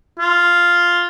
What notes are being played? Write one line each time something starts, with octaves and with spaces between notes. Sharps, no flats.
F4